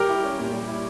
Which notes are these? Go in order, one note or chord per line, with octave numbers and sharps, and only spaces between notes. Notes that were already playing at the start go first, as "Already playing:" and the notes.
Already playing: G3 G4 A#4
E4
C#4
A#2
G3
E4